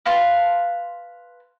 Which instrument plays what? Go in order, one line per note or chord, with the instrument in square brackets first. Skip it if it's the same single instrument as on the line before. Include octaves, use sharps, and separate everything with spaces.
[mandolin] B4 F5 A5 C6